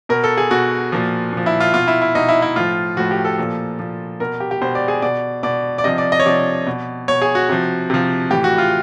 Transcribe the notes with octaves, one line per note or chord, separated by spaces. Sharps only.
B2 A#4
A4
G#4
B2 F#4
A#2 F3
A#2 F3
E4
F4
B2 F4
E4
E4
B2 D#4
E4
E4
A2 F3 F4
A2 F3 F#4
G4
A4
A#2 F3
A#2 F3
B2 A#4
G4
G4
B2 C5
D5
G#4
B2 D5
B2 D5
D5
C3 F3 D#5
D5
D#5
C#5
C3 F3 D5
B2
B2 C#5
G#4
F#4
C3 F3
C3 F3
A2 E3 G4
F#4
F4